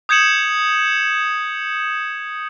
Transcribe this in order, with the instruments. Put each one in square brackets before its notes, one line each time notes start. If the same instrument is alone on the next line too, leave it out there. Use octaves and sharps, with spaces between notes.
[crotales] D#6 G6 G#6 C#7 E7 F#7